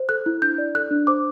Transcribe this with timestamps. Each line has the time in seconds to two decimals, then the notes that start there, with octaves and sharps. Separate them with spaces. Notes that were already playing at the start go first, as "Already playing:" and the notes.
Already playing: C5
0.09 A4 F#6
0.26 E4
0.42 D4 G6
0.58 D5
0.75 A4 F#6
0.91 D4
1.07 C5 D6